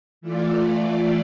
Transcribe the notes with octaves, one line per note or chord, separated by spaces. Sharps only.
E3 A3 F4 D5